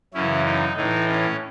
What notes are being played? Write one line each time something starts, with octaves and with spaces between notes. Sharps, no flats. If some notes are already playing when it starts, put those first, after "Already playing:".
F#2 C#3 E3 C#4 E4
D#4
A2 E3 D#4
C#4